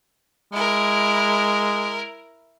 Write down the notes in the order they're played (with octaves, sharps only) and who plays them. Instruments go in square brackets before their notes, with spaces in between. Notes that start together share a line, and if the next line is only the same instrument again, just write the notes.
[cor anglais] G#3 [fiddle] E4 A#4